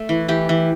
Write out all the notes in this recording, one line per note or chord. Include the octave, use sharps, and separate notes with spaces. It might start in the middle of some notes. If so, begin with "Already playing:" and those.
Already playing: A3
E3
E3 G4
E3